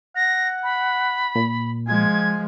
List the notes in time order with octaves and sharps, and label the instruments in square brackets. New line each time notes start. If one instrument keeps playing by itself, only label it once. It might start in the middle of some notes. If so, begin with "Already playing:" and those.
[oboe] F#5 [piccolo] A#6
[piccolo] B5
[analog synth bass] A#2
[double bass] F3 G#3 [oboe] G#5 [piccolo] G#6